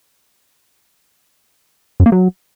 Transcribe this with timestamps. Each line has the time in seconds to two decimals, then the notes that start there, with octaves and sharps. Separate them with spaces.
2.00 F#2
2.06 A#3
2.12 F#3